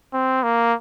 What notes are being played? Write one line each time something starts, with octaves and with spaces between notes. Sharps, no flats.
C4
A#3